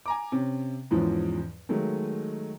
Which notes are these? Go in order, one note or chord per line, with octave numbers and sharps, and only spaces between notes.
G#5 A#5 D6
C3 C#4
E2 G#2 E3 F3 C#4
D#3 F#3 G#3 A3